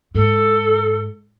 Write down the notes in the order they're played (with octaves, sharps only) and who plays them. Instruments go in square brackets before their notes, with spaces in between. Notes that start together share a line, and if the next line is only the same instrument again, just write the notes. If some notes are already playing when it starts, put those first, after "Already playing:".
[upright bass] G#2 [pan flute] A4